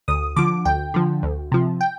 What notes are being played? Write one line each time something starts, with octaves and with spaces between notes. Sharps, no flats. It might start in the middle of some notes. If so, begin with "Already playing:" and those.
D2 D#6
D3 F3 D6
D2 G5
D3 F3
D2
C3 F3
G5